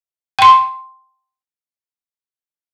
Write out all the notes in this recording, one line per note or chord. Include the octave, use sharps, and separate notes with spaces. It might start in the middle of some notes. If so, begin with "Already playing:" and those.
G5 C6